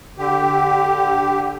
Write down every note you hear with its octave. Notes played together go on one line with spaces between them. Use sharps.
D3 G4